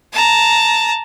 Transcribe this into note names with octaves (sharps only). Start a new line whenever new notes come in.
A5 A#5